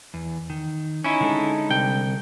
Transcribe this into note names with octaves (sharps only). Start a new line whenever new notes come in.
E2
D#3
C#4 D#4 E4
D3 G#3 A4
C2 G5